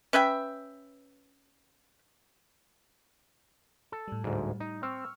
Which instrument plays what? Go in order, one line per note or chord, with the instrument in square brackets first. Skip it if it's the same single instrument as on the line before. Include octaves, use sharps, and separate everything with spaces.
[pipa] C#4 B4 E5 G5
[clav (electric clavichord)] A4
[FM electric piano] A2 G3
[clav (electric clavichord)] D2 G#2
D#4
[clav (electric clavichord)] C4 [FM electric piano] C#6 E6 F6